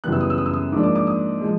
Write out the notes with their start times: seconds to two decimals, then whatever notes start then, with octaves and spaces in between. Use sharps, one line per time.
0.04 F#2 C#3 E3 G3 B3 F#6
0.12 E6
0.21 D#6
0.30 E6
0.38 D#6
0.46 E6
0.53 D#6
0.72 G#2 F3 A#3 D4 D6
0.83 D6
0.96 D6
1.07 D#6
1.41 F3 G#3